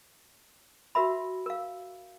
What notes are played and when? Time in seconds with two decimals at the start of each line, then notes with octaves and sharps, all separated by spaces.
0.95 F#4 A#4 E5 B5
1.46 A#4 F5